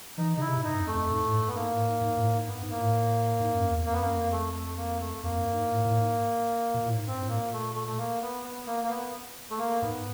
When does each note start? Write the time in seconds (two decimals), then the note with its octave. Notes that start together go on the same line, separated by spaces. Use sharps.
0.17 E3 D#4
0.36 C#3 D#4 E4
0.48 C3
0.57 G#2
0.63 G2 D#4
0.79 F2
0.87 A3
0.95 F2
1.10 G#2
1.25 A2
1.40 G2
1.48 B3
1.55 G#2 A#3
1.71 A2
1.86 G#2
2.01 G#2
2.17 A2
2.32 G#2
2.47 G2 B3
2.62 G#2
2.70 A#3
2.78 A2
3.40 G#2
3.54 F#2
3.70 E2
3.85 F2 A#3
3.93 B3
4.01 F#2 A#3
4.16 F2
4.31 A3
4.53 A3
4.77 A#3
5.00 A3
5.23 F2 A#3
5.39 G2
5.53 G#2
5.69 A2
5.85 A2
5.99 G#2
6.74 A#2
6.86 A2
6.96 G#2
7.07 G2 C4
7.22 A2
7.29 A#3
7.37 A#2
7.53 A3
7.75 A3
7.87 A3
7.98 A#3
8.22 B3
8.44 B3
8.67 A#3
8.83 A#3
8.89 B3
9.50 A3
9.58 A#3
9.81 G#2 B3